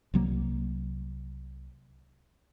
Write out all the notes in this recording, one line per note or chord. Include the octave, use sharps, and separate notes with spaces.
C2 F#3 A#3